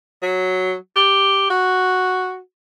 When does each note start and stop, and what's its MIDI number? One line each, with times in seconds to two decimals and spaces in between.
0.23 0.74 54
0.96 1.47 67
1.50 2.39 66